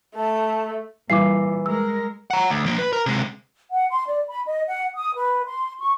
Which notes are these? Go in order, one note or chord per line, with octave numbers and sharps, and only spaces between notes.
A3 A5
A#2 E3 G3 D6 C7
G#3 A#4 E6
F#5 A#5
D2
F3 A#3
B4
A#4
C3 G#3
F#5
C6
D5
B5
D#5
F#5
D#6
B4
C6
C#6